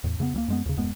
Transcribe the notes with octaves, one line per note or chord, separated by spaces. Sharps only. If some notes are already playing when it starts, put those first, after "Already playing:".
E2 A2
F2 C#3 A3 B3
C#2 G3 A#3
F#2 G#3 B3
D#2 C#3
D#1 F#2 G#3 B3